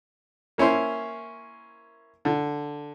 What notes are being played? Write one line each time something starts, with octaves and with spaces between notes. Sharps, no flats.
A#3 C#4 E4 C5
D3